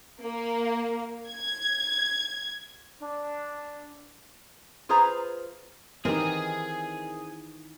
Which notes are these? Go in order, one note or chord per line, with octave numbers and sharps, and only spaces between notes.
A#3
G#6
D4
F4 G#4 B4 C5 A#5
D#3 E3 C4 E4 G4 G#4 A#4 D#5